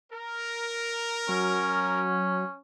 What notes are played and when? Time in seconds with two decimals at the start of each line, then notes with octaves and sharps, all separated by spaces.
0.12 A#4
1.29 F#3 C#4